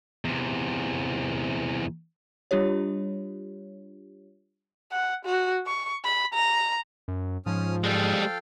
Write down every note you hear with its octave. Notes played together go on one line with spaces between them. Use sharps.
E2 C3
G3 D4 F4 G4 C#5
F#5
F#4
C#6
B5
A#5
F#2
G#2 F3 C#4 D#6 F6
G3 G#3 A4 F5 G5